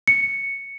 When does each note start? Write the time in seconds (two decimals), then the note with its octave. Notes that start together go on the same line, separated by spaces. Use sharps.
0.08 C#7